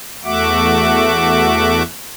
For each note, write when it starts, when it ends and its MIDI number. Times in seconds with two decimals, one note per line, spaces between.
0.25 1.83 40
0.25 1.83 57
0.25 1.83 66
0.25 1.83 76
0.25 1.83 78
0.25 1.83 86